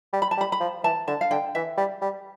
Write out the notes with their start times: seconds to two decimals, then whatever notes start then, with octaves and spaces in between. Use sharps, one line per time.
0.13 G3
0.22 B5
0.31 A5
0.38 G3
0.41 B5
0.52 B5
0.60 F3
0.84 E3 A5
1.08 D3 A5
1.21 F5
1.31 D3 G5
1.55 E3 E5
1.78 G3
2.02 G3